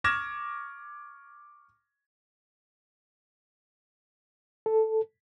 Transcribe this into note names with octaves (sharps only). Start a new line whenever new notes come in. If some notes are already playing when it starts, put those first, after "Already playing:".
C#6 D6 F6 G#6 A#6 E7
A4